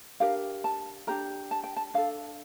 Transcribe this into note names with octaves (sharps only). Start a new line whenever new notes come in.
D4 G4 A#4 F5
A5
D4 G4 A#4 A#5
A5
G5
A5
D4 A4 F5